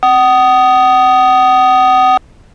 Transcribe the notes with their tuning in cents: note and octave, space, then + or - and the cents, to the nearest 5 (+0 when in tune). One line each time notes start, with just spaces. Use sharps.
F#5 +35 D#6 +0